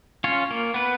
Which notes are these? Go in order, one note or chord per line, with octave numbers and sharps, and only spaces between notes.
C#4 F4 C#5
A#3
B3 B4